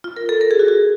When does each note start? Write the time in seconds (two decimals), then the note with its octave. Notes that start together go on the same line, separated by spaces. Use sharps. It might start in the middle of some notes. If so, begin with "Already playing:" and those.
0.04 F4
0.17 A#4
0.29 A4
0.41 A#4
0.51 G#4
0.59 F#4
0.68 G#4